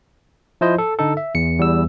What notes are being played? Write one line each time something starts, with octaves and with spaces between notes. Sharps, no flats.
F3 E4 C5 D#5
A4
D3 D#4 A4
E5
E2 C#7
E2 G3 E6